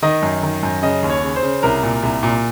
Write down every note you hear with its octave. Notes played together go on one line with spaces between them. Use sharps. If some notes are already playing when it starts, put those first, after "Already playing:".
D#3 D#5
F#2
D#3
F#2
C#3 D#5
D#2
C#5
C#3
C5
C#3
C2 A#4
A#2
C2
A#2